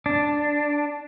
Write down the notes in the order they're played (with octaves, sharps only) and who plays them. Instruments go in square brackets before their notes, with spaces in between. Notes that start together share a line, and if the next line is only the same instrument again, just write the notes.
[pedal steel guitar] D4